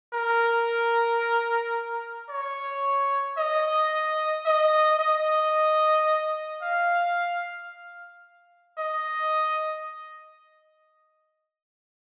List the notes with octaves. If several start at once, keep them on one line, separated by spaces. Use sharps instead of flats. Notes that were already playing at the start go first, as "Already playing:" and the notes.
A#4
C#5
D#5
D#5
D#5
F5
D#5